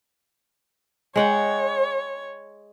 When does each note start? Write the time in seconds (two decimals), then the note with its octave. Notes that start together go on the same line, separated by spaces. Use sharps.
1.16 G#3 C#5 F#5 G5